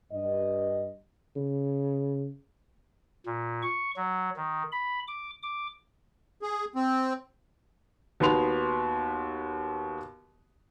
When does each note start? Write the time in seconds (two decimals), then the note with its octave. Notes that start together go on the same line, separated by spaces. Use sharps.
0.12 G2 D#5
1.36 C#3
3.26 A#2
3.62 C#6
3.96 F#3
4.36 D#3
4.72 B5
5.08 D6
5.43 D6
6.42 G#4
6.75 C4
8.20 D#2 B3 F#4 B5 C6 F7